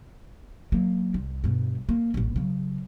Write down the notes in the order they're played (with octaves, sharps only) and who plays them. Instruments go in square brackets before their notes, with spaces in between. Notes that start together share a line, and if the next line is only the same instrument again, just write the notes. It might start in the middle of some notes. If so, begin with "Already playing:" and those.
[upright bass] F#3 A#3
C2
G2 B2
A#3
D#1 A1
C#3 F#3